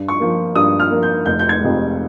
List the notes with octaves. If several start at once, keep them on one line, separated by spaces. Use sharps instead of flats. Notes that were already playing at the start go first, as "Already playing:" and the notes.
Already playing: G2
C#6
F3 A#3
G2 D#6
F6
F3 A#3
G6
F1 G6
G6
G#6
F2 C3 F3 G#3